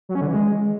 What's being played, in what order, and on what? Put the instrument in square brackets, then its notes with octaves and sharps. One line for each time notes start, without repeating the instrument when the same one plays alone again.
[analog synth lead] F#3
C#4
D3
E3
G#3